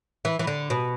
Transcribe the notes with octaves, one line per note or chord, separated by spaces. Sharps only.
E3
E3
D3
B2